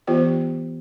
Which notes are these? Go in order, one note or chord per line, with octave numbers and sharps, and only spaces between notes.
E3 B3 F4 G4 C5